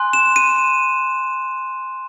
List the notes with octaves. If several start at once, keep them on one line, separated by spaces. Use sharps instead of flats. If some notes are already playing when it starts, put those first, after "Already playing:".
Already playing: G#5 C6 F#6
E7
D#7